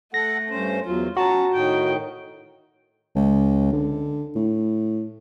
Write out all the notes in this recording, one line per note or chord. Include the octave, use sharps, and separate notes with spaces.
A3 A4 F#5 A#6
G2 C#4 C5
E2 F#3 F4
C#4 F#4 A5 A#5
A2 D#3 D#4 G5
C#2
D3
A2